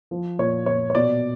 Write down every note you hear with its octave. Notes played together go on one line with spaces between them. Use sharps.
F3
A#2 C#5
A#2 C#5
C#5
B2 D5